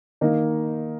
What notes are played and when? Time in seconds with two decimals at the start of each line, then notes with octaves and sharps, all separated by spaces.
0.21 D#3 A#3 D#4